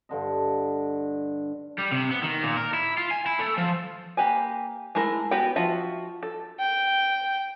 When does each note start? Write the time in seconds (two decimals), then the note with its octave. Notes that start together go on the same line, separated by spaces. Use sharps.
0.09 G2 D3 D#5
1.78 G3
1.92 C3
2.11 B3
2.23 D#3
2.43 A#2
2.57 A#4
2.74 E4
2.98 F4
3.11 G#5
3.26 E4
3.39 A3
3.58 F3
4.17 A#3 G4 B4 G#5
4.95 G#3 A3 E4 A#4
5.31 B3 F#4 G4 B4 G5
5.56 F3 F4 F#4 E5
6.23 A4
6.60 G5